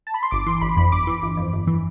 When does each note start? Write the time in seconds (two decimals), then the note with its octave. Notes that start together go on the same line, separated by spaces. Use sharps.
0.07 A5
0.14 B5
0.23 C6
0.31 G1 D6
0.46 E3 C6
0.61 G1 B5
0.76 F2 B5
0.92 G1 D6
1.07 E3
1.23 G1
1.37 F2
1.53 G1
1.67 E3